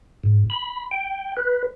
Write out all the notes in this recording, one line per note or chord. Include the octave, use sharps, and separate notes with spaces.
G#2
B5
G5
B4